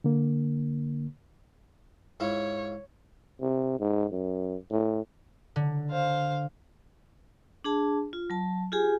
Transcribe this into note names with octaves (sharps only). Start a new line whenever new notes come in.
D3 A#3
G#2 E4 F4 C#5
C3
G#2
F#2
A2
D3
C5 F5
D4 G#4 A5
F4
F#3 A5
F4 G4 G#4 G#5